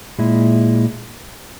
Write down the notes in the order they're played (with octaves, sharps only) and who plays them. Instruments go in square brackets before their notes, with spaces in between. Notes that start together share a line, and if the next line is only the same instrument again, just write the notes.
[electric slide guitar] A#2 G#3 E4